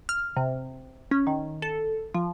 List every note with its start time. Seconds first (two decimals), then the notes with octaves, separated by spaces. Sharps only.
0.09 F6
0.37 C3
1.11 C#4
1.27 D#3
1.62 A4
2.14 F3